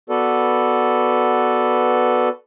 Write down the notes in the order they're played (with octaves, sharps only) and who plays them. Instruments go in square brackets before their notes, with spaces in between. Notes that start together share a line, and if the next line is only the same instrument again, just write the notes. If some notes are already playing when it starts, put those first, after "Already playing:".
[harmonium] B3 F#4 A4 B4 D5